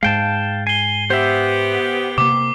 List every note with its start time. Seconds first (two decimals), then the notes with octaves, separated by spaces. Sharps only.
0.03 G#2 G#3 F5 G5 A5
0.67 G#5 C7 G7
1.10 B3 G4 C5 E5
2.18 C3 A#3 D6